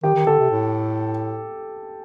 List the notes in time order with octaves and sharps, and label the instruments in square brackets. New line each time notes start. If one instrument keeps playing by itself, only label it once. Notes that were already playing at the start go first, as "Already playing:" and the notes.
[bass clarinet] D#3 [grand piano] G4
[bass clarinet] D#3
[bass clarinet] D3 [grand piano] A4
[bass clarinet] C3
A2